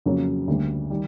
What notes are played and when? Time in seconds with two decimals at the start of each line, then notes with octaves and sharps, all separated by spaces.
0.06 F2 C#3 F#3 A#3 C#4
0.48 D2 D3 G3 A#3
0.90 D#3 G3